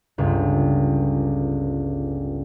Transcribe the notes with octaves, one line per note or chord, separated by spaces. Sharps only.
G1 C#2